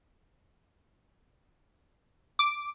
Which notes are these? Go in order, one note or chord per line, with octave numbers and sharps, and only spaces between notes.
D6